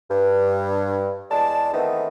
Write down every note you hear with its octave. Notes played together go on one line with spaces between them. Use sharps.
G2
E2 G#3 D5 A5
D#3 E3 A3 B3 C4 D#4